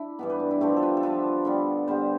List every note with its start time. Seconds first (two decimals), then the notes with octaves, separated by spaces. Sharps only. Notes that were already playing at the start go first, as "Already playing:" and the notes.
Already playing: D4 E4
0.19 G2 E3 B3 B4
0.30 B4
0.40 D4
0.51 E4
0.61 D3 F3 A3 G4
0.77 A4
0.83 B4
0.97 A4
1.03 D3 F3 A3 B4
1.45 D3 G3 B3
1.87 D3 G3 B3 C5